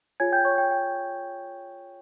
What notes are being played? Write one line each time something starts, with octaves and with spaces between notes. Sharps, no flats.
F4 G#4 C#5 G#5 G#6
G5 G6
C#5 C#6
G5
G5